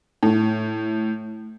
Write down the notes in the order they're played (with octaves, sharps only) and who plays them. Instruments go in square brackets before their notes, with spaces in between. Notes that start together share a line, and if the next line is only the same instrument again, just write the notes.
[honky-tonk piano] A2